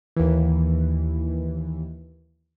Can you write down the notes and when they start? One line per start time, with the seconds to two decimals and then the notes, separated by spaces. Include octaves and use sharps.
0.16 D#2 E3